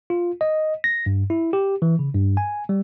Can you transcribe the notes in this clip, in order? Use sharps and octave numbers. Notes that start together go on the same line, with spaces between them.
F4
D#5
A#6
G2
E4
G4
E3
C#3
G2
G#5
G3